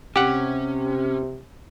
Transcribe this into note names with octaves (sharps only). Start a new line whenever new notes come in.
C3 C#4 G4 F#5